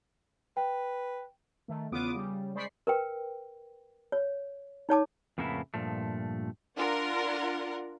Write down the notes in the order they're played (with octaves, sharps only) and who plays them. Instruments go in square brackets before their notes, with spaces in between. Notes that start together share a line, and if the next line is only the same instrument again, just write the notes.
[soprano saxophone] B4 [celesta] G5
[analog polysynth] D#3 A3
E2 C#3 B3 F4 D6 D#6
C#3 G3
G#3 C5 D5 B5 C#6 C7
[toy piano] A#4 B4 G5
C#5
D#4 C#5 A5 D6
[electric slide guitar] F2 A2 C#3 A#3 B3 E4
G2 A#2 F3 A3
[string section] D4 F4 A#4 F#5